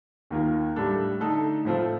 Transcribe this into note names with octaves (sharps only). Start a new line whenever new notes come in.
D#2 D#3 A#3 F4 A#4
A2 G3 D4 A4
D3 A3 D#4 A4
A2 F3 C4 F4 A4